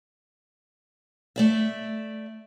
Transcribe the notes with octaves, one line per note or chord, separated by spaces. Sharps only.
A3 D5 E5